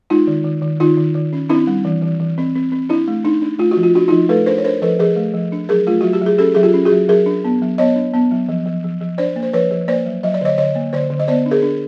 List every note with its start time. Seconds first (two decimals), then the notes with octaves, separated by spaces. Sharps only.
0.10 G#3 D#4 F4
0.28 D#3
0.44 D#3
0.62 D#3
0.80 D#3 D#4 F4
0.97 D#3
1.15 D#3
1.33 C#4
1.49 C4 D4 E4
1.67 G3
1.85 E3
2.02 E3
2.20 E3
2.38 C4
2.55 C4
2.72 C4
2.89 D4 E4
3.08 A3
3.25 D4 D#4
3.42 D4
3.59 A3 F4
3.71 F#4
3.77 F3
3.83 F4
3.95 D4 F#4
4.08 F3 D#4 F4
4.29 A3 A4 B4
4.46 D4 A#4 C5
4.58 C#5
4.65 D4 A#4 C5
4.82 F3 A4 B4
4.99 F3 G#4 A#4
5.16 A3
5.34 F3
5.52 D4
5.69 F#3 G#4 A#4
5.87 A3 F4
6.01 F#3 F#4
6.13 G4
6.22 F#3 G#4
6.38 C#4 G4 A4
6.55 F#3 G#4
6.63 F4 G4
6.74 C#4
6.85 F#4 G#4
6.92 F#3
7.08 F#3 G#4 A#4
7.26 D4
7.44 B3
7.62 F#3
7.78 B3 C#5 D#5
7.96 D4
8.14 B3
8.31 F#3
8.49 F3
8.66 F3
8.84 F3
9.01 F3
9.18 D4 C5 D5
9.36 A#3
9.43 C5
9.53 F3 B4 C#5
9.71 F3
9.88 A#3 C5 D5
10.06 F#3
10.23 F#3 D#5
10.34 D5
10.41 D3 C#5 D#5
10.58 D3 C#5 D#5
10.75 A#3
10.93 D3 C5 D5
11.10 D3
11.20 D#5
11.28 B3 C5 D5
11.46 D4
11.51 G#4 A#4
11.63 D4